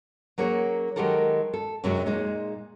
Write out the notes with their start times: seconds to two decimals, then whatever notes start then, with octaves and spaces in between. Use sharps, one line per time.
0.38 F#3 A#3 C#4 G#4 C#5
0.96 D#3 F#3 G#3 G4 A4 A#4
1.54 A4
1.84 F#2 C3 F#3 G#3 C#4
2.06 A#2 G#3 D#4